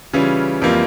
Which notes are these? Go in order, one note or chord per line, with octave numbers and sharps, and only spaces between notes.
C#3 E3 G3 C#4 F4
F2 E3 G3 A#3 F4